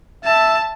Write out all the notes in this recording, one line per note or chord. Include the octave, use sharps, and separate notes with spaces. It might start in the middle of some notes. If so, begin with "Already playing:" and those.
E5 A5